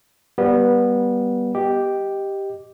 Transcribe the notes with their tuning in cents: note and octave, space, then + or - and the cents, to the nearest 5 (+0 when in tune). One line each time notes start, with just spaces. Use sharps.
G3 +0 B3 -20
G4 +0 D#5 +0